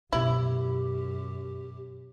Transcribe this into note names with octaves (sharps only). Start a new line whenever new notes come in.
F#2 B2 E4 F4 G4